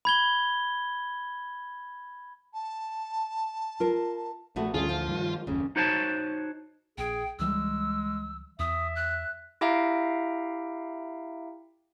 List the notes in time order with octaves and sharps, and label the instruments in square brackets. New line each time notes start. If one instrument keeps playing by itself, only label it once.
[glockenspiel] B5 G#6 G7
[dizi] A5
[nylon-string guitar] F4 A#4
[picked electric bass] A#1 [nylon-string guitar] A3 B3 F#4
[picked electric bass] D2 D3 E3 [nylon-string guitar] G3 C#4 G#4 [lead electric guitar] F4
[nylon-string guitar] F3
[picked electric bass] G2 D#3 G3
[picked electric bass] F#1 D#2 [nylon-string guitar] C#3
[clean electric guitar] D#4 F#4 C5 C#5 E5 A5
[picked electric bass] A#1 [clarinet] G#4 [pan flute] G5
[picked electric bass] C#2 E3 G3 [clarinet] G#3 [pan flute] E6
[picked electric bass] E2 [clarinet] E5 [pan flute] D#6
[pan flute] F#6
[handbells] E4 G4 E5 F5 G5 A#5